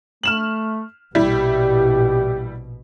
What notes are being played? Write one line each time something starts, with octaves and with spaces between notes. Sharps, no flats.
A3 F6 E7 F#7
A#1 B2 G3 E4 G4